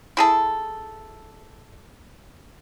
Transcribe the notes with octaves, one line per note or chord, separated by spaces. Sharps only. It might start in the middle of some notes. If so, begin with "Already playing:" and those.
E4 G#4 A4